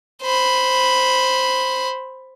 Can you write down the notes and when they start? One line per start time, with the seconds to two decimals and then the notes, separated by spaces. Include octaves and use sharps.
0.23 C5 B5